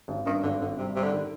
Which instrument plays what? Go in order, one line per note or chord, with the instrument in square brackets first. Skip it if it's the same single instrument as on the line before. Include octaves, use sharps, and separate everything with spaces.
[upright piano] G#1
[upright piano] G2 [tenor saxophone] D#3
[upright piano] G#1 [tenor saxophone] D3
[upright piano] G#1 [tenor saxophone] D3
[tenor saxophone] C3 [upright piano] G3
[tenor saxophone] C3 [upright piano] G3
[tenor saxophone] D3
[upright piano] D#3